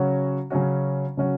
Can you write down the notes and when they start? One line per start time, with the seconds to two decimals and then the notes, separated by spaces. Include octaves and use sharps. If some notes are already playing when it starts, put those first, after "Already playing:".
Already playing: C#3 F#3 C#4 F#4
0.50 C#3 F#3 C#4 F#4
1.17 C#3 F#3 C#4 F#4